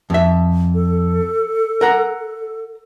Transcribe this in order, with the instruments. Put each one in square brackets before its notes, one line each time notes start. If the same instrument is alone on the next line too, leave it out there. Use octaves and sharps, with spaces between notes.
[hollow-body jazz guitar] F2 E5
[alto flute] A4
[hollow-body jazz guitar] A#4 F#5 A#5